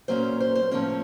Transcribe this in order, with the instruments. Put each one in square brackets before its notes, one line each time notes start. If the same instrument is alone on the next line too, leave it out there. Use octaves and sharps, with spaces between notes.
[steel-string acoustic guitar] A#2 F#3 A#3 C#4 C5
C5
C5
A2 F3 A#3 C#4 C#5